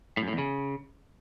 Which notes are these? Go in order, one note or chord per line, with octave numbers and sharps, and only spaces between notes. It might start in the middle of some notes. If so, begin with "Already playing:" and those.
A2
F#2
A2
E2
C#3